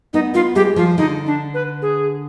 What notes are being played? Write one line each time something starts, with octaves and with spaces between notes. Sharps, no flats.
B3 D#4
B3 F4
G#3 G4
F3 F4
D3 D#4
D4
B4
G#4